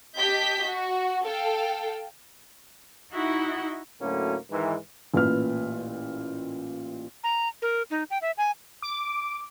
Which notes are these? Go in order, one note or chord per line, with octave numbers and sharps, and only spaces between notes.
G4 D#5 A5 G6 B6
F#4
A4 F5 G5
D#4 E4 F#4 D#5 E5 F#5
D2 A2 F#3 A#3 C#4
G#2 D#3 E3
A1 A#2 B4 F6
A#5
A#4
D#4
G5
E5
G#5
D6